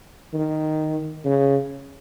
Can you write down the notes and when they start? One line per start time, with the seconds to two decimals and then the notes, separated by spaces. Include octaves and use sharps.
0.33 D#3
1.24 C#3